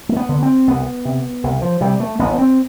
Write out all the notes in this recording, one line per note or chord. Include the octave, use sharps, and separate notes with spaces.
A3
B3
D3
C4
C2 B3
C3
C2
F3
C3 G3
A3
A1 B3
C4